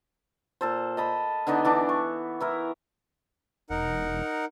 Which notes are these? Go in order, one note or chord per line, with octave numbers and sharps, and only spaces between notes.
A#2 A4 C5
D#5 A5 B5
D3 B3 D4 D#4
E3 D4 D6
C#6
B3 E4 A#4
E1 D#4 A#4 F#5